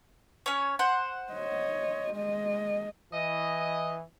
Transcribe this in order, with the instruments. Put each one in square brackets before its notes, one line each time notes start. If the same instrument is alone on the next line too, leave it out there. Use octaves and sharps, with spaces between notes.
[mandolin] C#4 C#5
C5 F#5
[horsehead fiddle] C#5 D#5
G#3 D#5
[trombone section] E3 [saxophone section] D#5